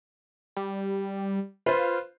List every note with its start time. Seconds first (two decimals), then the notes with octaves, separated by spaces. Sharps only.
0.57 G3
1.66 F4 B4 C5